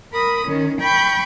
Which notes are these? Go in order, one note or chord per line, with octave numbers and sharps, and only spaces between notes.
A#4 B5 D#6
D#3 C#4
G5 B5 C#6 G6